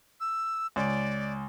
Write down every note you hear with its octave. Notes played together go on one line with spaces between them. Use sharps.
E6
C#2 D5